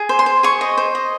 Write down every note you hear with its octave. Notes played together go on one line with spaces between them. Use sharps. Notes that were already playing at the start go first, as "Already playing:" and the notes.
Already playing: G#4
C5
C6
C5
G#4 C#6
D#5
C5
D#5